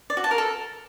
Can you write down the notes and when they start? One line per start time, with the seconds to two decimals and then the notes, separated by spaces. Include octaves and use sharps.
0.10 D5
0.17 F#4
0.24 A5
0.31 A#4
0.38 A4